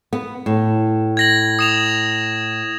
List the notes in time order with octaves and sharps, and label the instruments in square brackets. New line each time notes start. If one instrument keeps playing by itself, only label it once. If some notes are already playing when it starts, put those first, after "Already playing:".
[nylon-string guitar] B3
A2
[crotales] G#6 A#6 F#7
D#6 E7 F7